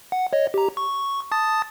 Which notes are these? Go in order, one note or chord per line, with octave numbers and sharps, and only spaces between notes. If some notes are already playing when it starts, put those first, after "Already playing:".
F#5
C#5 D#5
G4 A#5
C#6
A5 D#6 A6